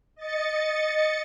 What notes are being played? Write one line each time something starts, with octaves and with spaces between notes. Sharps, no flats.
D#5 A6 C#7